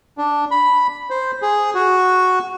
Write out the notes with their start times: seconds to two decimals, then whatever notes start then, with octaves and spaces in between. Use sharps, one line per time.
0.18 D4
0.51 B5
1.10 C5
1.42 G#4
1.75 F#4